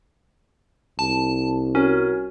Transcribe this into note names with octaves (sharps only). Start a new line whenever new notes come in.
C2 A5
C#4 F#4 A#4 C#5